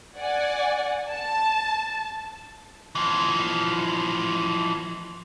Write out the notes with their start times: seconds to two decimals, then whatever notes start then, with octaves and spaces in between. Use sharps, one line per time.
0.17 D5 F#5 G#5
1.10 A5
2.95 E3 F3